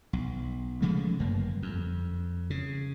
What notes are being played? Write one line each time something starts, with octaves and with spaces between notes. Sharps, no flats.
B1
C#3 F3 G#3 A3
G1 F#2 A#3
F2
C#3